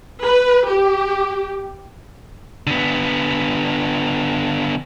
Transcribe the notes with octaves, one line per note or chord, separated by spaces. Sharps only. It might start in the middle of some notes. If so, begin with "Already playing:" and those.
B4
G4
D3 B3